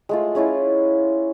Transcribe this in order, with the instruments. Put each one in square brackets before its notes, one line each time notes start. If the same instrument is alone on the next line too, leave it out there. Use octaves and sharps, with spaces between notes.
[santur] G#3 A3 F4
G#3 C#4 E4 F4